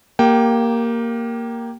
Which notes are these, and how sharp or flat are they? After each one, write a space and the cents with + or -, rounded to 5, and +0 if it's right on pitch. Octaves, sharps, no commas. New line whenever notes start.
A#3 +0 G4 +10 G5 -15